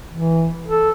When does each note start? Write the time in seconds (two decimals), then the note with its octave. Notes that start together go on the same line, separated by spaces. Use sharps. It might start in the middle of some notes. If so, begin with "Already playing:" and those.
0.13 E3
0.66 A4